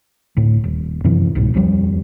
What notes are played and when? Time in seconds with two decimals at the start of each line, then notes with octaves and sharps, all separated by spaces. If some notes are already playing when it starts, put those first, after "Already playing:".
0.37 D2 A2
0.64 D#1
1.04 F#2 C3 E3 F3
1.35 C2 G#2 B2 G#3
1.54 D#1 F2 F3 G3